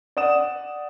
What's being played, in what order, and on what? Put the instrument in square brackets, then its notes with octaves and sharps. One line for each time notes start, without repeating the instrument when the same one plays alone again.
[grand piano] D5 F#5 D#6 E7